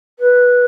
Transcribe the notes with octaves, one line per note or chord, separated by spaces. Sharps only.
B4